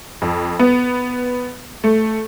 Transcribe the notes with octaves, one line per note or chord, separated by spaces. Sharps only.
F2
B3
A3